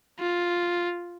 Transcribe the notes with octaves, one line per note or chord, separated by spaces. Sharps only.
F4